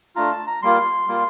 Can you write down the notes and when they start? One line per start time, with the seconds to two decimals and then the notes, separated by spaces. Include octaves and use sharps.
0.16 A3 D4 F4 A#5
0.31 A5
0.47 A#5
0.62 G3 A#3 F4 C6
1.08 G3 A#3 F4